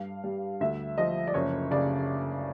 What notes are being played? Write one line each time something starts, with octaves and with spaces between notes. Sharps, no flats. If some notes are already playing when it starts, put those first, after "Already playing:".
Already playing: G2 F5
G3
D2 E5
F3 D#5
D5
F#1 C#5
C#3 D5